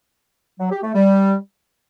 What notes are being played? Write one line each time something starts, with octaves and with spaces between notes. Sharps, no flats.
F#3
G4
A3
G3